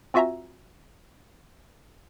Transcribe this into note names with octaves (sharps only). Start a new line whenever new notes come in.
C4 F4 F#4 E5 G#5 A#5